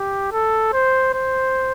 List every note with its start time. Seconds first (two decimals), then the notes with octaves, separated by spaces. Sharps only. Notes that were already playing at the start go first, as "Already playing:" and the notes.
Already playing: G4
0.32 A4
0.73 C5
1.14 C5